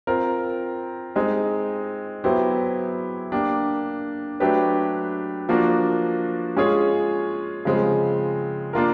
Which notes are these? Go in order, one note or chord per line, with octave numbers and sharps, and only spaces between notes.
C4 F4 A#4
G#3 C4 D#4
F#3 B3 E4 G4 C5
A#3 D4 G4
F#3 A3 D4 G4 B4
F3 A#3 D4 F#4
G#3 C#4 F4 G#4 C#5
C#3 F3 G#3 C4
A#3 D4 F4 A#4